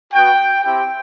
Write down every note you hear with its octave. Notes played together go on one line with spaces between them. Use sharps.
B3 F#4 G5
C4 E4 G4 G5